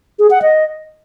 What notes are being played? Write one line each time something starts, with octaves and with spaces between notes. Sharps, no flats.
G#4
F#5
D#5